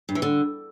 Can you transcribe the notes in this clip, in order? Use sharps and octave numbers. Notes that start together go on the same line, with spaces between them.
G2
E3
D3